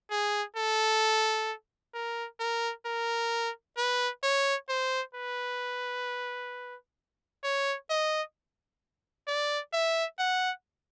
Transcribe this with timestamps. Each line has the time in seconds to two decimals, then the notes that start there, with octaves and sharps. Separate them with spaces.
0.10 G#4
0.56 A4
1.94 A#4
2.40 A#4
2.86 A#4
3.77 B4
4.23 C#5
4.69 C5
5.15 B4
7.43 C#5
7.90 D#5
9.27 D5
9.73 E5
10.19 F#5